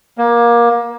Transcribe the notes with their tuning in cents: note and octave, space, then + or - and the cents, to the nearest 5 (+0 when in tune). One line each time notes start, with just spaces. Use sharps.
A#3 +20